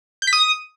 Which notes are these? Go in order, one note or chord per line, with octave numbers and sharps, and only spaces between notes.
G6
B6
D#6